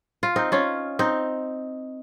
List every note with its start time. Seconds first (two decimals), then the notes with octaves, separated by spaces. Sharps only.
0.23 F4
0.36 C4 D#4
0.52 C#4 F4
0.99 C4 D#4